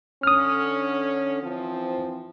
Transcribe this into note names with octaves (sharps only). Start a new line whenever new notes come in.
D3 C#4 D#6 F6
E3 F3 C4